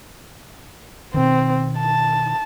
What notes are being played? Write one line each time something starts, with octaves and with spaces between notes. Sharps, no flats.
B2 D#3 C4
A5